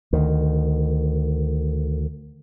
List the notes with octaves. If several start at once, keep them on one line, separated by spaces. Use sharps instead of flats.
D2 D#3